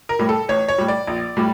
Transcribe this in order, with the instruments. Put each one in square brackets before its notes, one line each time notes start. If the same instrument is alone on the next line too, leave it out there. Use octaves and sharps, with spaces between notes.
[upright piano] A#4
A2 G3
A4
A1 C#5
C#5
A2 G3
D5
A#1
A2 G3